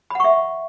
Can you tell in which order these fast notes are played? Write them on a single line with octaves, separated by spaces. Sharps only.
B5 F#5 C#6 E5